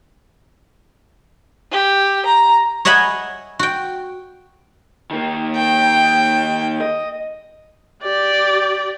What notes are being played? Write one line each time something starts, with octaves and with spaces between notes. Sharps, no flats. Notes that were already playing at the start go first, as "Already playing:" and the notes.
G4
A#5
C#5 D#5 E5 F#5 G#5 B5
F#4 G5
D#3 A#3
G5
D#5
G4 D5